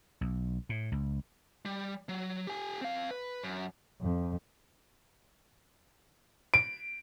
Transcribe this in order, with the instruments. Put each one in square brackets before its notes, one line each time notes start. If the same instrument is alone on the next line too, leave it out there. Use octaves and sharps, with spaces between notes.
[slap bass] B1
A2
C#2
[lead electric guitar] G3
F#3
G4 G#5
C4 F5
B4
F#2
[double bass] F2
[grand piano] D7